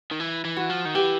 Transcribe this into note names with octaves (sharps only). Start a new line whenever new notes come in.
D#3
E3
E3
F#4
F3
D#3
E3 G4